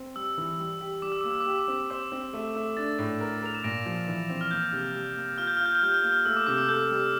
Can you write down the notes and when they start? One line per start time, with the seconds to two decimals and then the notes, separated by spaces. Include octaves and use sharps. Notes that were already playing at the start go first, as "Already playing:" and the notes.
Already playing: C4
0.16 G3 E6
0.37 E3
0.59 G3
0.81 G4
1.02 G3 D6
1.12 E6
1.21 A#3 D6
1.31 E6
1.40 D6
1.46 G4 E6
1.59 D6
1.68 C4
1.90 C5 D6
2.12 C4
2.33 A3
2.55 A3
2.77 D4 A6
2.99 A2
3.20 A#4
3.42 A#4 F7
3.55 E7
3.64 A#2 A#6 D7
3.86 F3
4.08 E3
4.29 C4
4.41 F6
4.51 A#3 G6
4.73 C3
4.95 G3
5.16 A#3
5.38 F4 F6
5.47 G6
5.57 F4 F6
5.66 G6
5.75 F6
5.82 G3 G6
5.94 F6
6.02 A#3 G6
6.12 F6
6.25 A3 E6
6.36 D6
6.47 C3 D6
6.58 E6
6.69 A4 G6
6.91 G3